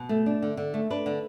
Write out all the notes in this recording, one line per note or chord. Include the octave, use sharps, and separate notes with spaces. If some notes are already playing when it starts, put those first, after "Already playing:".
Already playing: B2
A3
D4
D3
D3
A3
D4 B4
D3